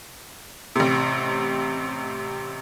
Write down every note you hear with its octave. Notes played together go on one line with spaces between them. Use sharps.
A1 C3